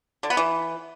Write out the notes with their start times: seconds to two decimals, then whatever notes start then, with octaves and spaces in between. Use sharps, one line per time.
0.23 D3
0.30 B3
0.37 E3